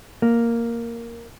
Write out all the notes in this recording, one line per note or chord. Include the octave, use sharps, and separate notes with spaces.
A#3